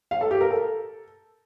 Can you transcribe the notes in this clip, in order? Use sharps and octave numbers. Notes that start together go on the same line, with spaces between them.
F5
A4
G4
A#4
A4